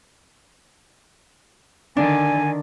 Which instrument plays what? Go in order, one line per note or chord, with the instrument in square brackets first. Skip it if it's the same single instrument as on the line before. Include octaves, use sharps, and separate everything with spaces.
[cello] D3 D#3 [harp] D4 [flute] G#5